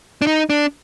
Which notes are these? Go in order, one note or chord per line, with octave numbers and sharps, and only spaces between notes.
D4
D#4
D4